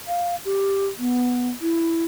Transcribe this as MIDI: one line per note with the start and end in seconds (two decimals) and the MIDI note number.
0.07 0.36 77
0.45 0.87 67
0.99 1.49 59
1.61 2.05 64